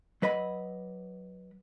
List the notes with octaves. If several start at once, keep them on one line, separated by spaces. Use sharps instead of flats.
F#3 B4 D#5 B5